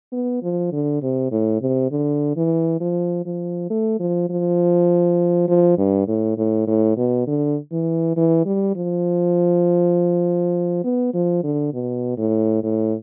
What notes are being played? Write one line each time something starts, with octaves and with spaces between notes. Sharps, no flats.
B3
F3
D3
C3
A2
C3
D3
E3
F3
F3
A3
F3
F3
F3
G2
A2
A2
A2
B2
D3
E3
E3
G3
F3
B3
F3
D3
B2
A2
A2